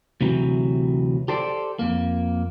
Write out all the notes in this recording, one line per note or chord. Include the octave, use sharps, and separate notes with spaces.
D2 C3 E3 F#3
G4 A4 C5 D5
F2 A#3